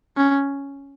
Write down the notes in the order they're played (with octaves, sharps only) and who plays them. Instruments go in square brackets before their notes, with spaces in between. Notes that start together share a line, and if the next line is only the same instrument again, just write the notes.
[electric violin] C#4